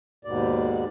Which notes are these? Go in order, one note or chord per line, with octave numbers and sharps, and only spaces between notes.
D#2 G#2 B2 D5